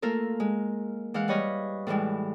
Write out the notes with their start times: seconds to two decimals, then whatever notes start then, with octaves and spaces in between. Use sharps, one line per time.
0.02 A3 A#3 F4 A4 A#4
0.40 G#3
1.14 E3 G#3 F5 F#5
1.28 G3 B4 C#5 D#5 F5
1.87 A2 E3 G3 G#3